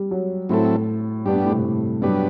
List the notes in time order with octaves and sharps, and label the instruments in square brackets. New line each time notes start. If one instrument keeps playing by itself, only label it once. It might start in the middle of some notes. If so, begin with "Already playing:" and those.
Already playing: [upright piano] G3
F#3
[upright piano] A2 [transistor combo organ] F#3 C4 E4 A4
[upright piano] G2 [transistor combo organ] B3 D4 G4
[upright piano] G2
A2
C3
A2
[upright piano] G2 [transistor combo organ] F#3 B3 D4 G4 B4